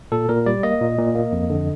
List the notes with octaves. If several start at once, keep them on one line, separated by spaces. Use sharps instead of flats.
A#2 A4
A#2 A#4
G3 D5
A#3 D#5
A#2
A#2
A#3
F2
D3